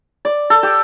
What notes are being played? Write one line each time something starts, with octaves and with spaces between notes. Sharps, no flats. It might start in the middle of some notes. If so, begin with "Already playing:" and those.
D5
A4
G4